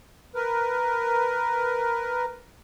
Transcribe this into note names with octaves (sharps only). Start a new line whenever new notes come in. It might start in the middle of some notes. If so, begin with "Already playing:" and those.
A#4 B4